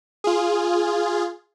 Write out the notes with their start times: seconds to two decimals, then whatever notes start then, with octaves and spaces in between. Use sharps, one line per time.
0.24 F4 G#4